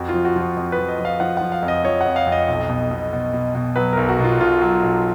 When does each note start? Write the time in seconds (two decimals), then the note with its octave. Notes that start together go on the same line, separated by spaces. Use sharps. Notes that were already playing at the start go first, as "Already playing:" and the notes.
Already playing: F2 F#4
0.09 F4
0.14 F3
0.25 F#4
0.36 F3 F#4
0.57 F2
0.72 B4
0.79 F3
0.88 D#5
0.99 F3
1.05 F5
1.20 F3 F#5
1.37 F3 F#5
1.52 F5
1.63 F2
1.68 D#5
1.84 F3 C#5
2.01 F#5
2.06 F2
2.16 F5
2.26 F2
2.32 D#5
2.48 B1
2.69 B2
2.91 B2
3.13 B2
3.33 B2
3.55 B2
3.76 F#3 B4
3.93 B1 A#4
4.09 F#4
4.19 B2
4.24 F4
4.40 B1 F4
4.61 F#3
4.82 B1